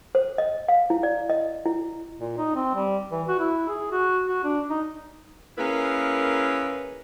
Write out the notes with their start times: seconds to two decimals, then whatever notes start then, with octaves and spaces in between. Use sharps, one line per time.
0.15 C5
0.38 D#5
0.68 F5
0.90 E4
1.03 D5
1.30 D#5
1.66 E4
2.19 A#2
2.38 D#4
2.55 C4
2.75 G3
3.11 E3
3.28 F#4
3.39 E4
3.68 G#4
3.91 F#4
4.27 F#4
4.44 D4
4.70 D#4
5.58 A#3 C#4 E4 G#4 A#4 B4